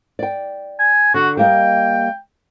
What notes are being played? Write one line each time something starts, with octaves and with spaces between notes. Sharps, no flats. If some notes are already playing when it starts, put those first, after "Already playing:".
D5 G5
G#5
D3 F#4
G3 A#3 D#5 G5